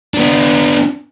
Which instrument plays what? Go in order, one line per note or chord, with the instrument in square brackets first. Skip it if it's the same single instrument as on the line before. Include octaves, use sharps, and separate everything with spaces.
[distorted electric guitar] B3 D4